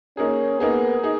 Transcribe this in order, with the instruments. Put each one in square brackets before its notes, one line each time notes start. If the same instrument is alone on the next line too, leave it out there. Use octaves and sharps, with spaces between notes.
[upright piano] A#3 D#4 G#4 [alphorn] C#4
[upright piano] A#3 D#4 G#4 [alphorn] B3
[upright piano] D#4 G#4